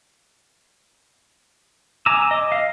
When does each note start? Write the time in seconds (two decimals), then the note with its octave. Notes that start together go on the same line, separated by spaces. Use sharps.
2.06 G#5 A#5 D6 E6
2.31 D#5
2.52 D#5 F5